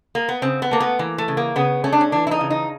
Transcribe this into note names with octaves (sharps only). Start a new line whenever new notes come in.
A#3
B3
C#3 C4
B3
A3 A#3
B3
E3 A#3
A3
C#3
A#3
C#3 B3
A3 C#4
D4
C#4
E3 D4
E4
D#4
C#3
D#4